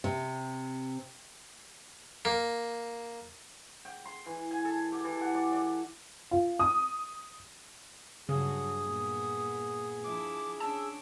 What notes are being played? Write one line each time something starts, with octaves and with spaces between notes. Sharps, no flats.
C3
A#3
G5
C6
E3
G#5
A4
G4
E3
F#5
D5
D5
F4
D#6
G2 C#3 F#3 G#4 D#6
A#2 B3
F3 D4 E4 D6
C#4 D4 A5 E6